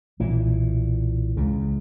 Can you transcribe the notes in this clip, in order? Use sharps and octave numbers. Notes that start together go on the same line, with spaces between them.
B1 A#2 E3
C#2 C#3